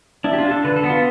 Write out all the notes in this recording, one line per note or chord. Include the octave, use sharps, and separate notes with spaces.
D4 E4
G4
F4
D4
A4
D3 B4
A4
B3
F4